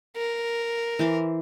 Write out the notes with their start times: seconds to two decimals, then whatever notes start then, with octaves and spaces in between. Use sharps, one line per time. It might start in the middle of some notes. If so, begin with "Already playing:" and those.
0.17 A#4
0.99 E3 C5 D6